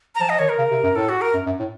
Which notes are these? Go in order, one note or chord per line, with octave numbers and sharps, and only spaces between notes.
A#5
F3 A5
D#5
D#3 C#5
A#4
C#3
C3
F#2
A2 A4
F#4
A#4
F#2
F#2
A2